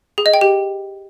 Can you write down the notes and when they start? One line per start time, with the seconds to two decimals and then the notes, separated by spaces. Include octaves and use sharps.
0.18 G#4
0.26 D#5
0.34 G5
0.41 G4